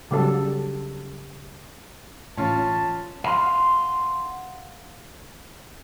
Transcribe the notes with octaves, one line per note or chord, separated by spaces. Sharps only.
C#3 F#3 G3 A4
A1 A2 C#4 F4 A5
F5 F#5 A#5 C6